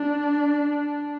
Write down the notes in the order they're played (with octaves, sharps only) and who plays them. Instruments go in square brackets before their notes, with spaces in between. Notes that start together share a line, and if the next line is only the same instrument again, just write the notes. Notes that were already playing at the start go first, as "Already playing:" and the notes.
Already playing: [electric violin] D4